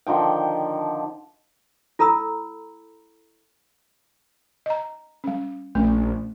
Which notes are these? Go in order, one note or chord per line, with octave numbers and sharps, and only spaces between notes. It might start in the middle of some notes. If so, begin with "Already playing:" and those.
D3 D#3 F3 G5
E4 A4 A#5 B5 E6
D#5 A#5
G3 C#4
A#1 A3 C#4